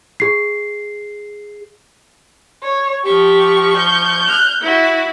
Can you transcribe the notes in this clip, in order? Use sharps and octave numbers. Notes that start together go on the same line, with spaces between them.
G#4 C7
C#5
F3 G4 C#6
G6
F6 F#6
E4 F#4